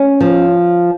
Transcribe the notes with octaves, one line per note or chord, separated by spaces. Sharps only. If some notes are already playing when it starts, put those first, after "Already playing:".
Already playing: C#4
F3